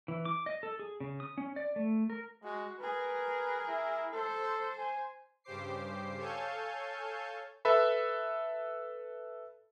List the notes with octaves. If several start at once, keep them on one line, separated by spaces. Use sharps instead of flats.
E3
D6
D#5
A4
G#4
C#3
D#6
C#4
D5
A3
A#4
G#3 F#4
G#4 A#4 B4
E4
A4 C5
G#5
G2 C#3 G4 C5 D6 C7
A4 C#5 F5 G#5 A5 G6
A4 B4 E5 B5